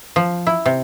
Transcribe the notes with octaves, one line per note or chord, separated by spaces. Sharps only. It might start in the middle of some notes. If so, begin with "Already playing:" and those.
F3
E4
C3